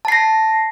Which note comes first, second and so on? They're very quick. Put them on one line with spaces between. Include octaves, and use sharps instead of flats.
A5 C7 A#6